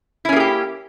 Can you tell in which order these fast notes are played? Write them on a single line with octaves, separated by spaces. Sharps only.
E4 C#4 A#3 G#4 G4